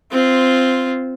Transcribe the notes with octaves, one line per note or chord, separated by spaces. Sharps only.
C4 F4